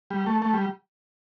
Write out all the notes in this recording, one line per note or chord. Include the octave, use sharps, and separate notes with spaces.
G3
A3
A3
G3